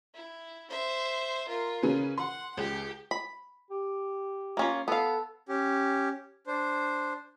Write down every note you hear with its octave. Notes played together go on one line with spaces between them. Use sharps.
E4
C5 E5
F4 A#4
C#3 C#4 B4
F#5 C6
C#2 G4
B5
G4
A#3 C#4 F4
B3 A4 F5
C#4 G4
D4 C5